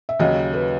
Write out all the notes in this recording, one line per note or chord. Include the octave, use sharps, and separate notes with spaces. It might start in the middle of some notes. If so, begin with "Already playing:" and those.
E5
D#2 C#3 F#3 D#5
B4